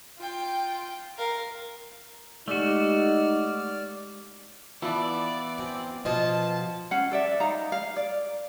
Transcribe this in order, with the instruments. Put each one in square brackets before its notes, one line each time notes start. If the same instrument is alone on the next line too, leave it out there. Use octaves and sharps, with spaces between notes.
[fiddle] F4 G5
A#4 F5
[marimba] G#3 G4 [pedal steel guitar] A3 F#4 [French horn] D#4 [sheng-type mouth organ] D5 F6
[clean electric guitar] E3 B3 E4 [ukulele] F4 A5 [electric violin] D5
[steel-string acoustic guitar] F#2 C4
[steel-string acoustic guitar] B2 F3 F4 [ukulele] D#5 [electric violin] A5
[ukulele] C#4 F5 F#5
A4 D5 E5
D#4 F5 A#5
F5
D5